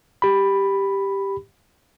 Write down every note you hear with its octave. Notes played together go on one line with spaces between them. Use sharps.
G4 B5